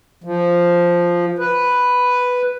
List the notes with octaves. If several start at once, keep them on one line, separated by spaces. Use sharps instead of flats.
F3
B4